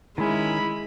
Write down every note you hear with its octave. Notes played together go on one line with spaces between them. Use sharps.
D#3 G#3 C#4 E4 E5 B5